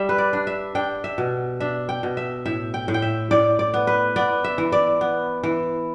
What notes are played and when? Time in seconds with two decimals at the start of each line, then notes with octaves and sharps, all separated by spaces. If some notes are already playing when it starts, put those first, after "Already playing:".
Already playing: G3 E5
0.09 B4
0.18 D5
0.33 D4
0.47 E5
0.75 D4 G5
1.04 E5
1.18 B2
1.60 D4 E5
1.89 G5
2.03 B2
2.17 E5
2.46 A2 E5
2.74 G5
2.88 A2
2.94 G5
3.02 E5
3.31 A2 D5
3.59 D5
3.74 B3
3.87 B4
4.16 B3 D5
4.44 E5
4.58 E3
4.72 D5
5.01 B3
5.43 E3